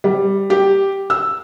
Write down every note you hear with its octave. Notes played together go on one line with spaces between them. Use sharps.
G3
G4
E6